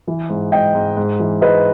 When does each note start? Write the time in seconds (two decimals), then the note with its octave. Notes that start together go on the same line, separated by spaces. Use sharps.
0.07 E3
0.29 G#2
0.52 G#2 D#5 G5
0.75 G#2
0.97 G#2
1.20 E3
1.42 G#2 B4 D#5